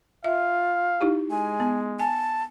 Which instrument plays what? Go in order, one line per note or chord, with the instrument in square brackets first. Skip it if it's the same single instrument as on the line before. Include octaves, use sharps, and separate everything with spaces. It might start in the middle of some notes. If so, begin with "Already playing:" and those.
[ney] F4 [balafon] E5 [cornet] F5
[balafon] D#4 E4 G4
[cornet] G#3 [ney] G#5
[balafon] B3
[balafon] G#5 [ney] A5